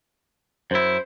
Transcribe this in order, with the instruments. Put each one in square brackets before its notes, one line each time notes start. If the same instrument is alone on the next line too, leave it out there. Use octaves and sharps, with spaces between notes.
[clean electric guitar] F#2 E4 [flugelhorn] C5